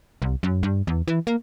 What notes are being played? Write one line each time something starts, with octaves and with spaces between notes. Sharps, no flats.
C2
F#2
G2
E2
E3
A#3